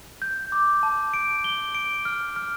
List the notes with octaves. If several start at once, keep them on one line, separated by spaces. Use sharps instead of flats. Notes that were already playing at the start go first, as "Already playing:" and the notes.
G6
D6
A5
D7
G7
D7
F6
F6